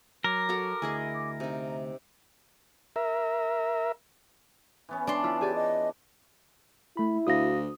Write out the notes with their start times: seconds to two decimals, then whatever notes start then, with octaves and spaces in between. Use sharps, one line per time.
0.24 F#3 A#4 D6
0.49 F#4 A4 A#5
0.82 D2 E4 G#4 D#5 G#5
1.14 D6
1.40 C3 D#4 E5
2.96 A#4 E5
4.89 E3 B3 C#4
5.07 D4 D5 A5 C6
5.24 E4 F4
5.41 G4 G#4 D5
5.55 D#5
6.97 A3 E4 B5
7.27 D2 F#4 F5 D#6 A#6